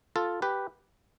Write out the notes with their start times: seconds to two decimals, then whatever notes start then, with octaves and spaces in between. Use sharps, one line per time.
0.16 F4 A4
0.42 G4 B4